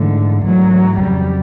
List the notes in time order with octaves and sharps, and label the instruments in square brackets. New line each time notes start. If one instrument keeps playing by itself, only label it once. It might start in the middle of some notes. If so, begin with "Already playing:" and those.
Already playing: [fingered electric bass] G#2 E3 A3 [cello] D3
[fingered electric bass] G#2 E3 A3 [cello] F#3
[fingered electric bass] F2 C#3 F#3 [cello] G3